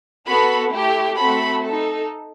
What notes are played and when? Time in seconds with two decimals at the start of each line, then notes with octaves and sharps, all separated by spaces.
0.27 B3 F#4 A4 B5
0.73 A3 E4 G4
1.18 A3 C4 F#4 A4 B5
1.63 D#4 A4